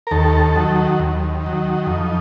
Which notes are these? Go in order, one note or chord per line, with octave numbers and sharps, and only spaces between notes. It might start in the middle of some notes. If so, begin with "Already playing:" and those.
A#4
D#2 A4
D#3 F#3
D#2
D#3 F#3
F2 D#4